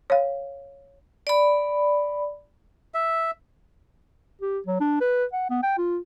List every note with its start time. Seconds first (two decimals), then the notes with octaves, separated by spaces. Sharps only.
0.10 C#5 F5
1.27 D5 B5
2.94 E5
4.42 G4
4.67 F#3
4.80 D4
5.00 B4
5.33 F#5
5.50 B3
5.63 G5
5.78 F4